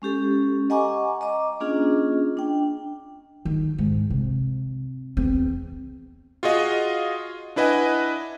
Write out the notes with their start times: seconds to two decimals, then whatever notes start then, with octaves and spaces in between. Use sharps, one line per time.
0.02 G#3 C#4 G4 A4
0.70 D#5 F#5 G#5 A#5 C#6 D6
1.21 D#5 A#5 D6
1.60 A#3 C#4 D4 F4 G#4 D#5
2.37 D4 G5
3.45 D#3
3.78 G#2
4.10 C3
5.17 E2 C4
6.43 F4 F#4 G#4 D#5 F5
7.56 D4 E4 B4 D#5 F#5 G#5